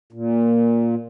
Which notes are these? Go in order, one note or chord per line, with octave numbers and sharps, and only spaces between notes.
A#2